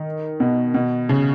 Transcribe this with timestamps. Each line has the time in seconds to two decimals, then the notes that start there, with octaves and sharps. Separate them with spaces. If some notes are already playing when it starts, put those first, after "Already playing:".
Already playing: D#3
0.40 B2
0.74 B2
1.09 C#3